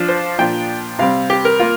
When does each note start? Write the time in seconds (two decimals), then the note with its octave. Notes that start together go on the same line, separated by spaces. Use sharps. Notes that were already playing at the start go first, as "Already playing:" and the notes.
Already playing: F3 D4 F4
0.09 C5
0.38 A#2 F3 D4 F4 G5
0.99 C3 G3 C4 F5
1.30 G4
1.45 A#4
1.60 A#3 F4